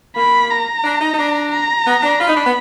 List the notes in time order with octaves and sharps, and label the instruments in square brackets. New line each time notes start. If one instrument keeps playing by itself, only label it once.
[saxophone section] A#3 [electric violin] B5
[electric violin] A#5
[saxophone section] D4
D#4
D#4
D4
[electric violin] A#5
[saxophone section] B3
D4
[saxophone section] F4 [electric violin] B5
[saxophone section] D#4
D4
B3